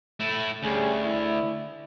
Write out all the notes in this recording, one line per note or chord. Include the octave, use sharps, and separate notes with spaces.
A3 E4
D2 G3 C#4 G#4
E4